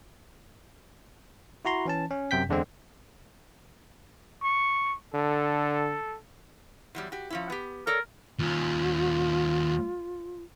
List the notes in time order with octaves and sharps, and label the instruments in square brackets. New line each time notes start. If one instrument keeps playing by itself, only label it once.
[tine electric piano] E4 F#4 A#5 C6
E3 C#4 A5
C#4
F#2 C3 G5 G6 B6
E2 D3 G#3 C4
[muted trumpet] C#6
[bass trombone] D3 [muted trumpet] A4
[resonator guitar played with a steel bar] E2 F#3 G3
F#4 G4
F3 C#4 E4
B3 G4
[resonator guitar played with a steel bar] A4 C#5 D5 [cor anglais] A#4
[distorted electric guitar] D#2 C#4 [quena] F4